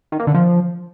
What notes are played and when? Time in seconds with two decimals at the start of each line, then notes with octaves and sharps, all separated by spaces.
0.12 D#3
0.20 A#3
0.27 D3
0.34 F3